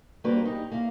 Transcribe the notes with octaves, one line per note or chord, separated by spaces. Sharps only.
G3 A#3 D4 F#4 B4 C5
D#4 G4
A#3 E4 F5